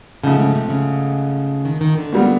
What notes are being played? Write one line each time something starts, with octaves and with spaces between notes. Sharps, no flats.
G#2 C#3 F3 A3
C#3
C3
C#3
D#3
D#3
D3
A#2 G3 B3